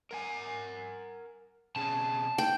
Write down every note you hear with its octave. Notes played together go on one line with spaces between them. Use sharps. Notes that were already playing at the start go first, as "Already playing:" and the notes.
A#4 F#5 G#5
B2 C#4 G#4 A5
G5